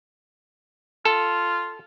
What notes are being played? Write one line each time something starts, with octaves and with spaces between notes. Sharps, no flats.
F4 A4